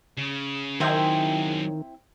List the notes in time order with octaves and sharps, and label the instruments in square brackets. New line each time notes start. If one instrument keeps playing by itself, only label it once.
[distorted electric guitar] C#3
[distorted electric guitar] F#2 G#4 [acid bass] D#3 [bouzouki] C4 E4 G5